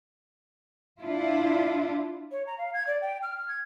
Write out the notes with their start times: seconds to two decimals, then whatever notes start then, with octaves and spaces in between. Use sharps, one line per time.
1.02 D4 E4 F4
2.32 C#5
2.47 A#5
2.58 F5
2.74 G#6
2.87 D5
3.01 G5
3.23 F6
3.48 G#6